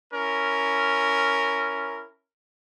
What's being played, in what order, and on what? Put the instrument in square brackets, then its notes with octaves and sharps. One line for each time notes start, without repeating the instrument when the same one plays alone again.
[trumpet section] C#4 E4 A#4